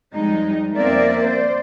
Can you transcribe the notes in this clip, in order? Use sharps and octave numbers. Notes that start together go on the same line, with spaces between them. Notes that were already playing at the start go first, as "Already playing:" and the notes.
F2 G3 G#3 D#4
F2 A#3 C4 A#4 D5 E5
C5 D5